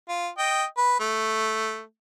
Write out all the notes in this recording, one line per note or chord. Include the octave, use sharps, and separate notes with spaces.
F4
D#5 G5
B4
A3